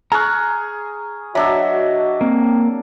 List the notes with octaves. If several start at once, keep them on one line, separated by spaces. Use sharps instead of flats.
G#4 A#5 C#6 F6 F#6
F#3 D4 F#4 D#5 E5 E6
A#3 C4